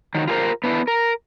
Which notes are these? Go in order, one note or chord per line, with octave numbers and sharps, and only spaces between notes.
D#3 F#3
F4 G4 G#4 A#4 C5
B3 D4 E4 B4
A#4